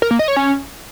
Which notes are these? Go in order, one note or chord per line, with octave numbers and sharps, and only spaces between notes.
A#4
A#3
D#5
C#5
C#4